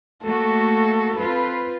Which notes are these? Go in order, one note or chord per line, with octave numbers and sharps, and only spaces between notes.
A3 A#3 F#4 A4
C4 F4 B4